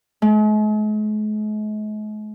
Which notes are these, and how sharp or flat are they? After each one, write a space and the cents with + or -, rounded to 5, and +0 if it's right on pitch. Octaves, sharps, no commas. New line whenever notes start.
G#3 +45